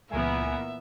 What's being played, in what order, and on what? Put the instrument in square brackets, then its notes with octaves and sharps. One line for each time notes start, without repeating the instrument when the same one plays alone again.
[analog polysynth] C#2 G#5 [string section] A#2 E3 [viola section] B3 A#4 [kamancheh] E5